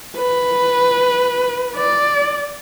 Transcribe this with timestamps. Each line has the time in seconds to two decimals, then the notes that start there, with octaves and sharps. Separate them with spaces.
0.17 B4
1.76 D5